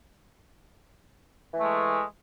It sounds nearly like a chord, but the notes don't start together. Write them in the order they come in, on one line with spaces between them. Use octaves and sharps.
E3 A3 G#3